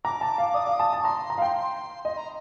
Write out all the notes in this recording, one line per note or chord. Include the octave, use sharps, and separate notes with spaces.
A#5 D6
A5
F5
D5 D#6
F5 D6
D#6
A5
A5
A#5 C6
A#5
F5
G5
D#5 C6
A#5